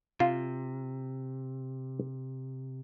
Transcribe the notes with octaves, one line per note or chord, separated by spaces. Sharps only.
C3 F4